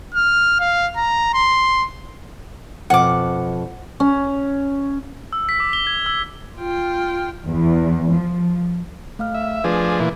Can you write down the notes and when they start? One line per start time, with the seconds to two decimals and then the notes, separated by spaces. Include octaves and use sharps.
0.14 F6
0.60 F5
0.96 A#5
1.34 C6
2.90 F2 B2 F3 F#5 D6
4.00 C#4
5.33 E6
5.49 B6
5.60 D6
5.73 G7
5.87 G#6
6.06 E6
6.58 F4 G5
7.46 E2
8.12 F3
9.19 A3 F5 F6
9.34 E5
9.64 F3 A3 D4 G#4 B4
10.00 A#2 E3